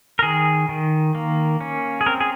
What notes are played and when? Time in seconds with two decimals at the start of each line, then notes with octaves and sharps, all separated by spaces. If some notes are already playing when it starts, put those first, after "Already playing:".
0.19 A#4
0.23 D#3 G#4
0.69 D#3
1.15 A#3
1.61 C#4
2.01 G#4
2.06 C4 A#4
2.20 G#4